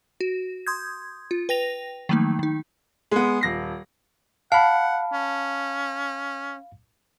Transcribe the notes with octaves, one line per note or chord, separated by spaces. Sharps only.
F#4
C6 D#6 G6 G#6
F4
B4 G5 A#6 F7
D#3 F3 F#3 A3 A#3 D#4
D#3 D#4
G#3 B3
D#1 A#6 C7
F5 F#5 A5 B5
C#4